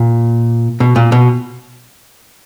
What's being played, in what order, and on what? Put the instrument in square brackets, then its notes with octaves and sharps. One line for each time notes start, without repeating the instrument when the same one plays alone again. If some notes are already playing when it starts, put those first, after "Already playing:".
Already playing: [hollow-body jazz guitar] A#2
B2
A#2
B2